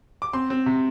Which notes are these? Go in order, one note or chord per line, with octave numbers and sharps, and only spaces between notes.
D6
C4 C6
C4
C3